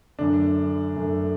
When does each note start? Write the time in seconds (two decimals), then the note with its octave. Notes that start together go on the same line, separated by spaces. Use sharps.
0.18 F#2 D3 A3 D4
0.96 F#2 D3 A3